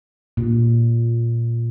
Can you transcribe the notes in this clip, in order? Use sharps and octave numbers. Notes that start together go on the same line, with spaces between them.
A#2